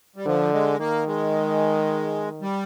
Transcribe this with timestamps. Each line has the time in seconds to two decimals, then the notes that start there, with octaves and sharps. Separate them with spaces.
0.16 G3
0.26 D3 F3
0.53 G#3
0.79 D#3 A#3
1.07 G#3
2.42 G3